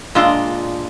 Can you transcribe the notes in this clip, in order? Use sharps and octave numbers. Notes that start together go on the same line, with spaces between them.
A#2 G#3 D4 F4 D#5